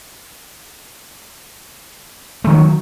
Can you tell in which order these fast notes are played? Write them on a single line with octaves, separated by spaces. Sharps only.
A3 D#3 F#3